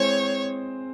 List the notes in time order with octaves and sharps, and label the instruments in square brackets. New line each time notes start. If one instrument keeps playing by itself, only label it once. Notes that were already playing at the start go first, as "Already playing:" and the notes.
Already playing: [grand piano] G#3 C4 E4 G#4 C5 [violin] C#5